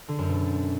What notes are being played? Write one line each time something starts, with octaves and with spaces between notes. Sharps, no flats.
D3
F#2
B2